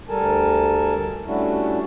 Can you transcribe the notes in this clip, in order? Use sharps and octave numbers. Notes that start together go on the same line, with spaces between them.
D2 G3 A4 A#4 G#5 A5
G3 A3 C#4 D4 E4 F#4